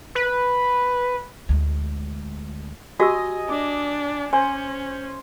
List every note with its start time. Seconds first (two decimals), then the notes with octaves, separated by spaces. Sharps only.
0.15 B4
1.49 D2 G#3
3.00 F#4 G4 D#5 G#5 D#6 E6
3.49 D4 D6
4.33 C#4 C5 G#5